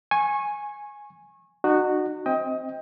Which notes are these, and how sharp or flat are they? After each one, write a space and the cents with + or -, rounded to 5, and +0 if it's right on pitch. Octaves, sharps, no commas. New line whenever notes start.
G#5 +0 C#6 -25
D#4 -40 F#4 +0
C4 +0 D#5 +25 G5 +15